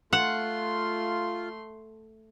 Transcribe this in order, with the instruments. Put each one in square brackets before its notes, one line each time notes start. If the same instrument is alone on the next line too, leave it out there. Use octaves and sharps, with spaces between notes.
[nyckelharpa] A3 C6 [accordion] F4 [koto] F#5